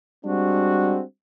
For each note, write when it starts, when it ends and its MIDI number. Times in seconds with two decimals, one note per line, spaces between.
0.25 1.02 55
0.25 1.02 56
0.25 1.02 60
0.25 1.02 62
0.25 1.02 66